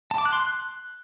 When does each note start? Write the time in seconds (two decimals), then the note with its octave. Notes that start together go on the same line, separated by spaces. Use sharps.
0.11 A5
0.18 D6
0.25 F#6
0.33 C6
0.40 F#6